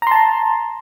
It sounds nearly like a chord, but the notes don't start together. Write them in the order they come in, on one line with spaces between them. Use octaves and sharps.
A#5 C6 A5